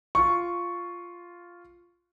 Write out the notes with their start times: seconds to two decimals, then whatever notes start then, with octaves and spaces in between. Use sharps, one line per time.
0.15 F4 C#6